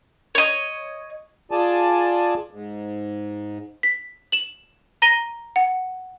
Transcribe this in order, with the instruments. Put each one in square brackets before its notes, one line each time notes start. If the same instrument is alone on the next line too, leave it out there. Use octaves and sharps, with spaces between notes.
[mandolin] C#5 D#5
[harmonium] F4 G#4 D5 G#5 A5
G#2
[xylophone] B6
E7 F#7
A#5 A#6 D#7 G7
F#5